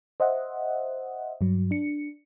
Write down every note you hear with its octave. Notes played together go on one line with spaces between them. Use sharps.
C5 D#5 E5 F#5
G2 F#3
D4 C#7